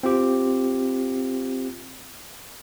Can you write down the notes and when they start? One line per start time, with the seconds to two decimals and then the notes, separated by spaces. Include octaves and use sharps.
0.03 C4 F4 G4